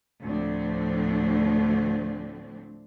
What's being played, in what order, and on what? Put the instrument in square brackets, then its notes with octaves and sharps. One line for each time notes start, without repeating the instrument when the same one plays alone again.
[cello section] D2 A2 F3 A3 C4 D4